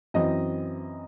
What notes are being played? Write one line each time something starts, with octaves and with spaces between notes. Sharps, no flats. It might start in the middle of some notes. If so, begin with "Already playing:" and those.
F#2 E3 C4 D#5